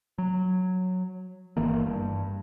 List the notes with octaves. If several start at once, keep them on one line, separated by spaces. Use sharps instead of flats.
F#3
G1 D#3 E3 A#3
G2